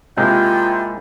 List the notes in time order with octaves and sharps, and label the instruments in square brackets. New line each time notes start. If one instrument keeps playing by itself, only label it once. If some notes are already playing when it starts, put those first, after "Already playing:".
[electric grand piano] C3 [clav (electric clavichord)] G#3 A#3 E4 [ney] F4 [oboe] G5